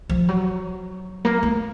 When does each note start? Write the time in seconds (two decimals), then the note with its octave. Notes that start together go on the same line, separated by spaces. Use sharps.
0.09 F3
0.29 F#3
1.25 A#3
1.43 A3